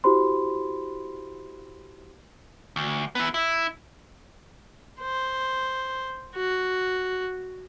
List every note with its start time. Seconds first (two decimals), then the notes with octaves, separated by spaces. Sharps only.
0.04 E4 F#4 G4 C5 B5 C6
2.76 D2
3.15 B3 E4
3.34 E4
5.01 C5
6.36 F#4